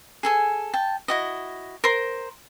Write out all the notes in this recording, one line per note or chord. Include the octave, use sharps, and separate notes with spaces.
G#4 A4 G#5
G5 A5
E4 F#4 D#5
A#4 C5 C6